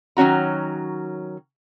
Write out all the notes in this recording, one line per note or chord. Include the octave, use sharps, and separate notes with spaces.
D#3 F#3 C#4 F#4 A#5